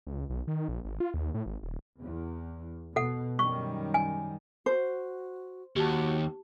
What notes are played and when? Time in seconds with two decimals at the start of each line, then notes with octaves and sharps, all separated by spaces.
0.07 C#2
0.30 B1
0.47 D#3
0.68 A#1
0.85 G#1
1.00 F4
1.14 D#2
1.34 A2
1.46 G#1
1.63 D#1
2.00 E2
2.96 B2 A4 F#5
3.39 F#2 D#3 G3 C#6
3.94 G#5
4.66 F#4 C5
5.76 D#2 F#4 G4 A5